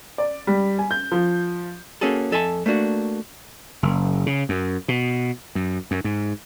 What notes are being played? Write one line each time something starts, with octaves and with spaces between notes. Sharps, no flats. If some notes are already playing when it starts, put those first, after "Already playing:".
D5
G3
G#5
G6
F3
A#3 C#4 F#4 G#4 A4
F2 A4 E5 G#5 A5
A3 A#3 D4 F#4
F#1
C#3
F#2
B2
F#2
F#2
G#2